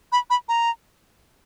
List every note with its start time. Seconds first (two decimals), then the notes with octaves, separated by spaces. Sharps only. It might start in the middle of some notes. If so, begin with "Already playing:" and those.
0.12 B5
0.30 B5
0.49 A#5